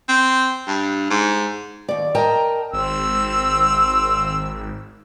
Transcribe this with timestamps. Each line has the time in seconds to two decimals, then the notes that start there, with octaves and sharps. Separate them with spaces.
0.09 C4
0.67 G2
1.10 G#2
1.88 D#2 D5
2.15 A#4 D#5 G5 A5 A#5
2.73 G#1 C4 E6